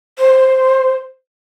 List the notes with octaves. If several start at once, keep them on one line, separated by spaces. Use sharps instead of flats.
C5